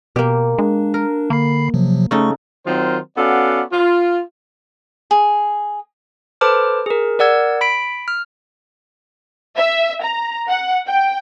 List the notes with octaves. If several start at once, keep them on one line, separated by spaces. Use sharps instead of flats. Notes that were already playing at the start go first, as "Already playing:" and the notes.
B2 A#3 G4
G#3 D4
A#4
D3 A#3 B5 C7
C3 F3 F#3
C#3 A3 D#4 A4 C#6
D#3 F#3 C4 F4 A#4 C5
B3 C#4 F#4 A4 D5 F5
F4
G#4
A4 B4 C5 A5 D6 F6
G#4 A#4
A#4 D5 F#5 E6 G#6
B5 B6 D7
F6
E5
A#5
F#5
G5